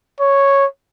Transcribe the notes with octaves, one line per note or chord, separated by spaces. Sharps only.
C#5